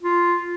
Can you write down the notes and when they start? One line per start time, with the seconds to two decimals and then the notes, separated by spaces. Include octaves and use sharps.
0.03 F4